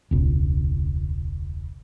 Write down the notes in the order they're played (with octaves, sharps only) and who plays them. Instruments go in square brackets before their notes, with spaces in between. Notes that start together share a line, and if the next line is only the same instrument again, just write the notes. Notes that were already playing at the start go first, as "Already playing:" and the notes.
[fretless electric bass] E1 C#2